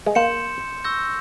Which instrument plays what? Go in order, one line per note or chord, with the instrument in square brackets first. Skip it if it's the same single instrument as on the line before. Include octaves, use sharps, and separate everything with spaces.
[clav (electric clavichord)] G#3
[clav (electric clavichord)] A#3 [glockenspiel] C6 G6 C#7 E7
[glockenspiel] C#6 E6 G6 A#6